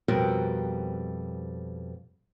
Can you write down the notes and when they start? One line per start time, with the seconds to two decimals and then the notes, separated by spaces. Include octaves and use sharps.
0.08 F2 B2 G3 C4 F#4 A#4